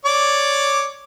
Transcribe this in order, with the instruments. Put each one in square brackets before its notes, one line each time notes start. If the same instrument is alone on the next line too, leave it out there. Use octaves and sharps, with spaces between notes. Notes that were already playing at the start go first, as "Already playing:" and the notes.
[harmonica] C#5 D5 D6